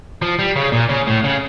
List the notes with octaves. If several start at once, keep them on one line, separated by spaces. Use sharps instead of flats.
F3
G3
C#3
A#2
C#3
A2
C#3